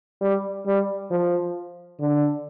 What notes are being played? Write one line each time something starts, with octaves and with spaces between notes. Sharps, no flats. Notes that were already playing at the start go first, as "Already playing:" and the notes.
G3
G3
F3
D3